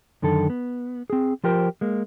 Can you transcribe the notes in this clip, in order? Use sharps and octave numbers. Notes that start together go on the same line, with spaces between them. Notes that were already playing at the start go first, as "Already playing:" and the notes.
F#2 D3 D#3 A4
B3
C4 G#4
F3 F4 G4 A#4 C5
G#3 A#3